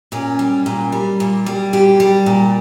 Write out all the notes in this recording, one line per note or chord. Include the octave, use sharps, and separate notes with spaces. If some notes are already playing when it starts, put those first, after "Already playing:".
A#2 C#4
G3
A#2
G3
A#2
G3
A#2 G4
G3
A#2